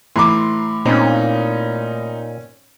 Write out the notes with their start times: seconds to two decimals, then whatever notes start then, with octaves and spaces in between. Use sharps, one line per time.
0.16 A2 E3 A#5 C6 D6
0.86 A#2 C4 C#4 D#4